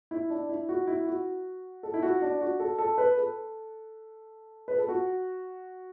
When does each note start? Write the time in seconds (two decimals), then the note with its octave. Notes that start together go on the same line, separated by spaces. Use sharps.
0.11 E4
0.30 D4
0.49 E4
0.69 F#4
0.87 E4
1.06 F#4
1.83 A4
1.94 E4
2.02 F#4
2.22 D4
2.41 F#4
2.60 A4
2.78 A4
2.98 B4
3.17 A4
4.68 B4
4.78 A4
4.89 F#4